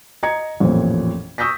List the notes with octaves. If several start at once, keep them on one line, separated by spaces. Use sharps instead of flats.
D#5 A#5 G#6 C#7
A1 F2 A#2 C5
C#6 D#6 E6 G6 A#6 B6